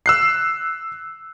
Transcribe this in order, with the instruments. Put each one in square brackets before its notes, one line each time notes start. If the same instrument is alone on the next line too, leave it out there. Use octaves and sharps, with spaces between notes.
[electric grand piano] E6 F#6 C7